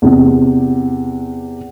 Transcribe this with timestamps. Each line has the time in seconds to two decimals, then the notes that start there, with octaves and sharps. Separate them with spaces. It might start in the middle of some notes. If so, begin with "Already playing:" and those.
0.02 E2 C3